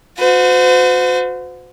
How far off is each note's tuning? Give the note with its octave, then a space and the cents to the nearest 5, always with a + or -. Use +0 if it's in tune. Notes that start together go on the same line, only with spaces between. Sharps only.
F#4 -35 C5 -40